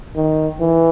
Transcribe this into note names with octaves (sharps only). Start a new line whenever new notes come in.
D#3
E3